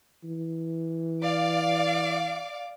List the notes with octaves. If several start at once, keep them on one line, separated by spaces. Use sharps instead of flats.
E3
D5 F5 D6